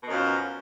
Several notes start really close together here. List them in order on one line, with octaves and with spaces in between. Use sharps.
B2 D#3 F#2 F3